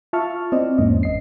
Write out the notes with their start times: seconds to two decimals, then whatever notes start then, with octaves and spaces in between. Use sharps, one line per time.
0.13 F4 E5 A5 C#6 F6
0.52 C4 E4 C5 D5 D#5
0.78 E2 G#2 A#3 C#4 D#5
1.03 G1 D#5 C7